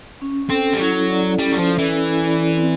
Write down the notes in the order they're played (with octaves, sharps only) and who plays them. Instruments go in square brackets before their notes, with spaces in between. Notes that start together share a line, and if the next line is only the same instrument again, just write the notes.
[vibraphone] C#4
[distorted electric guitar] C4 [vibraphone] A4
[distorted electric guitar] G3
[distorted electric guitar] F#3 [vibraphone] E4
[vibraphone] D5
[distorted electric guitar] G3 [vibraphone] C#4
[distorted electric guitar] F#3
F3
[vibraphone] A4
[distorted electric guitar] E3
[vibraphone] E4
D5
C4